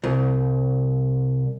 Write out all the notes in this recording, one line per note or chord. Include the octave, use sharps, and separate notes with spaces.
C2